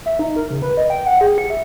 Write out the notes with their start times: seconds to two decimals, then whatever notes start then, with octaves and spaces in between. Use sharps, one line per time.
0.06 E5
0.19 D#4
0.36 A#4
0.50 C#3
0.62 B4
0.77 D#5
0.90 G5
1.06 F#5
1.21 G#4
1.38 C#7
1.50 E5